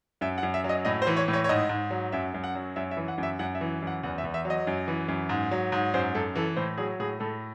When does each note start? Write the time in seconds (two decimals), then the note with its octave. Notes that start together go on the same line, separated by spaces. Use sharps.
0.21 F#2 E5
0.38 F#5
0.43 F#2
0.54 E5
0.64 F#3
0.69 D#5
0.85 A2 D#5
1.02 C5
1.07 E3
1.16 C#5
1.28 A2
1.33 C#5
1.44 C#5
1.49 G#2 D#5
1.69 G#2
1.91 F#3
2.12 F#2 E5
2.34 F#2
2.44 F#5
2.55 F#3
2.76 F#2 E5
2.91 E5
2.97 E3
3.08 F#5
3.18 F#2
3.23 E5
3.39 F#2 F#5
3.55 E5
3.61 E3
3.82 F#2 F#5
4.03 E2 F#5
4.18 E5
4.24 E2
4.34 E5
4.45 F#3
4.50 D#5
4.67 F#2
4.88 E3
5.08 F#2
5.29 G#2
5.51 F#3
5.72 G#2
5.94 F#2 C5
6.15 F#2 A4
6.35 E3 A4
6.56 A2 C5
6.78 F#3 G#4
7.00 A2 G#4
7.20 A2 A4